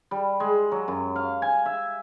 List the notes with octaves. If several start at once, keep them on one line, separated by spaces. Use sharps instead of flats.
G3
G#3
F#3
F#2
F5
G#5
E5